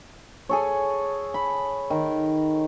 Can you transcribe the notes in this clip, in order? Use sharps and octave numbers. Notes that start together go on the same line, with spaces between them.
G#4 A4 C#5
B5
D#3